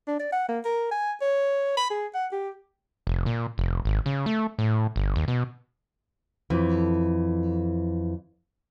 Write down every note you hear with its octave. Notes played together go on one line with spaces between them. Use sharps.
D4
D5
F#5
A#3
A#4
G#5
C#5
B5
G#4
F#5
G4
F1
A#2
F1
G#1
C#3
A3
A2
G1
D#2
B2
F2 E3